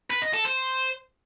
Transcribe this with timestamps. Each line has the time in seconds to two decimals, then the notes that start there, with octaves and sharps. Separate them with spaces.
0.10 B4
0.22 D#5
0.34 A4
0.45 C5